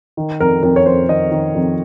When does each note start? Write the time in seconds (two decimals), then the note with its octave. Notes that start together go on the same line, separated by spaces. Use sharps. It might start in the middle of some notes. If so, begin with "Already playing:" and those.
0.17 D#3
0.40 F2 A#4
0.63 F2 A#4
0.76 C#5
0.86 F2 C5
1.09 D#3 D#5
1.31 D#3
1.55 F2